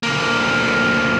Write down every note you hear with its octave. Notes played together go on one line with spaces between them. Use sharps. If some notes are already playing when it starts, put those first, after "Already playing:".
D2 A#3